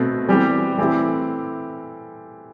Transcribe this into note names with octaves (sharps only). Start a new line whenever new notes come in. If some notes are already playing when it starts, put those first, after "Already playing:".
Already playing: B2 A3 C4
E3 G3 C4 G4
E3 A3 C4 E4 G4